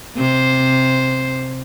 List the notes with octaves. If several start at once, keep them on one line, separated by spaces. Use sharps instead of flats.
C3 C5